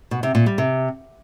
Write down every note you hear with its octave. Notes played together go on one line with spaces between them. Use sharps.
B2
C3
A#2
G3
C3